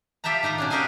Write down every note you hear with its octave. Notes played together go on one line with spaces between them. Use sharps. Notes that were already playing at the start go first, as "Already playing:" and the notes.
F4 G4 E5 G5 A5 A#5
D#3 D#4 F4 A#5
B2 C#4 D4
F#4 G4 A#4 D#5 F5 G#5